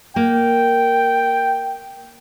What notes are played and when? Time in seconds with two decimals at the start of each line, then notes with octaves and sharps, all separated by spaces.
0.16 A#3 G5